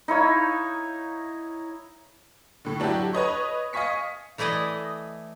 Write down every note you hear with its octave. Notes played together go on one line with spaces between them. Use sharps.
D#4 E4 C#5 F5
A2 D3
F#3 D4 E4 F#4 G4
B4 C#5 D#5 C#6
D#5 F5 G#5 C#6 B6 C#7
E3 A3 E4 D5 D#5